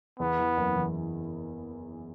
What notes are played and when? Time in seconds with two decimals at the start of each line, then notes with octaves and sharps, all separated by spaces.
0.20 E2 B3
0.39 E3
0.57 F#1
0.76 E3